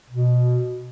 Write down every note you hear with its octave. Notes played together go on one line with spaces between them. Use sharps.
B2